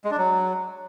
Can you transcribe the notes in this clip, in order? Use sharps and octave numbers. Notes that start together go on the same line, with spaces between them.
G#3
D4
F#3